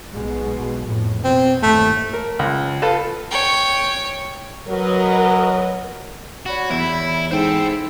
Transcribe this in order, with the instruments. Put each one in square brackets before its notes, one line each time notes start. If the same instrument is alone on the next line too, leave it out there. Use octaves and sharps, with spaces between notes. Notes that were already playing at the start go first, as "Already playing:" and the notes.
[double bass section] B1 B2 G#3
F2 A2
[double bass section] B2 [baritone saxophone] C4
[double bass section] G1 D#2 A2 [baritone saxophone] A3
[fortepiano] A#4
C#2
F4 A4 B4 A5
[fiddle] C#5 G5
[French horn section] F#3 [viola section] A#4 B4 D#5
[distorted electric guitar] F#4 [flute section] C#5 D5 B5
[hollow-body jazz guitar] E2 [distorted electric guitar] E4
[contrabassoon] G#2 [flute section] E4 A4 E6 [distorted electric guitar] C5 G5